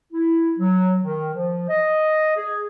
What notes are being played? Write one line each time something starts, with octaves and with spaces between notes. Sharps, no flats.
E4
F#3
D#3
F3
D#5
G#4